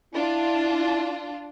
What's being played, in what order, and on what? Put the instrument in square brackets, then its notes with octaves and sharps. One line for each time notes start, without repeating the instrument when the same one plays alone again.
[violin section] D4 F4 [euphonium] E4